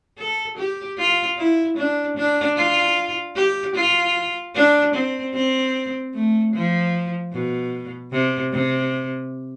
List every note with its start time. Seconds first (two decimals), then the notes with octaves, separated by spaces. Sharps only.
0.18 A4
0.57 G4
0.98 F4
1.38 E4
1.77 D4
2.17 D4
2.57 F4
3.36 G4
3.75 F4
4.55 D4
4.94 C4
5.34 C4
6.14 A3
6.54 F3
7.32 B2
8.12 C3
8.52 C3